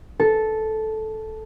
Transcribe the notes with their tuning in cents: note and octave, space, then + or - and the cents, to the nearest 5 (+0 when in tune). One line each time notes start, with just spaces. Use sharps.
A4 -10